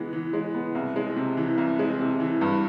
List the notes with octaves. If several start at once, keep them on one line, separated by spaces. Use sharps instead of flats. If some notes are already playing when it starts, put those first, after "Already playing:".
Already playing: E3 G#3 B3
E3
G#3
B3
C2
G#3
C3
E3
C2
G#3
C3
E3
G2